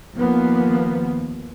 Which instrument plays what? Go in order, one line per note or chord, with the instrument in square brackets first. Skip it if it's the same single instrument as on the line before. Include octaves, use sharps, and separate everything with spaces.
[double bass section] D#2 F3 A#3 B3